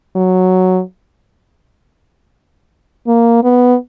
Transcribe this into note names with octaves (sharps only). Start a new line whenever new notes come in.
F#3
A#3
B3